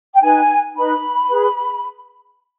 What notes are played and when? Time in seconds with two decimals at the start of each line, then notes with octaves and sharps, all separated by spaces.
0.15 G5
0.22 D#4 B4 G#5
0.75 D#4 B4 B5
1.28 G#4 B4